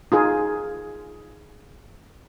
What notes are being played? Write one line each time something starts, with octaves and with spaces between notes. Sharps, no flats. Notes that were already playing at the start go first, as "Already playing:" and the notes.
D#4 F4 G#4